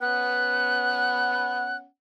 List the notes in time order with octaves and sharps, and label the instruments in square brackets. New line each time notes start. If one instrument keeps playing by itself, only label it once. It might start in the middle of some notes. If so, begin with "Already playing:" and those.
[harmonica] B3 C#4 F#5 [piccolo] F#6